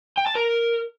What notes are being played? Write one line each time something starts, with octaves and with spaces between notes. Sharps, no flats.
G5
A5
A#4